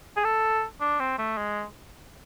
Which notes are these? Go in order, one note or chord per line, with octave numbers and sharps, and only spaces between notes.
G#4
A4
D4
C4
A3
G#3